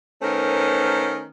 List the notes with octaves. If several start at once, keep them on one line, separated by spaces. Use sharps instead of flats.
D#3 A3 B3 C#4 A#4 C5